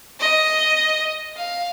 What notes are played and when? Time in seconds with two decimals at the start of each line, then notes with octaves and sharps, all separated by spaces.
0.20 D#5
1.36 F5